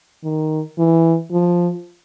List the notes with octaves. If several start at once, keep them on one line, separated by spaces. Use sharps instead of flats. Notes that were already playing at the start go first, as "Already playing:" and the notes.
D#3
E3
F3